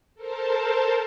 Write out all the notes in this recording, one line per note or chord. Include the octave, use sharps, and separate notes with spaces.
A4 A#4 C5 A5